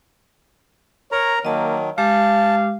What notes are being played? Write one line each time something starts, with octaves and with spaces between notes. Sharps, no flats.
A#4 C#5 A#5
D#3 F#3 A#3 D#5 A5
G#3 G4 F5 A5 D6